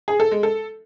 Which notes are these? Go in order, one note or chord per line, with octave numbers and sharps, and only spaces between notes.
G#4
A4
G#3
A4